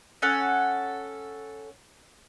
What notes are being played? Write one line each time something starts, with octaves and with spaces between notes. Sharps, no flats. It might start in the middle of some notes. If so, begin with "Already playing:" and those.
C#4 A4 F#5